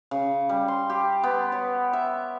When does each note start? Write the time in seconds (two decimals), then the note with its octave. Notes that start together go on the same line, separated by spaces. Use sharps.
0.11 C#3
0.49 G3
0.68 C6
0.90 G4
1.23 B3
1.52 C#5
1.93 E5